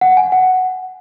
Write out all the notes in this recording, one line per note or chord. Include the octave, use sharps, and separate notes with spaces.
F#5
G#5
F#5